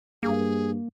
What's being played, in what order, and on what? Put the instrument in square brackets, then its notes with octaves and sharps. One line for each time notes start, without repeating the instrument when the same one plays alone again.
[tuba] G2 [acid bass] A#3 [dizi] G#4